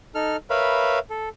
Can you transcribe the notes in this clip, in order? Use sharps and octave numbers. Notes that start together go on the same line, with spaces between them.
D#4 A4 F6
A#4 B4 C#5 E5 F5 B5
A4